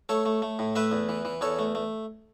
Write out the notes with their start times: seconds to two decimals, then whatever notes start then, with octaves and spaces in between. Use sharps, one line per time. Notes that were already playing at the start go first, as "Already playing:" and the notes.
0.09 A3 A4 C#5
0.26 A3
0.42 A3
0.59 A2
0.76 A3 B4 E5
0.92 E2
1.09 E3
1.25 E3
1.41 E2 A4 C#5
1.59 A3
1.75 A3